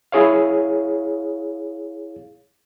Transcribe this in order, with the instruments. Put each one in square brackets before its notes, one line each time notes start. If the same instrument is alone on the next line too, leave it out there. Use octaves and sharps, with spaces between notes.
[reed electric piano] E4 G#4 C#5 F5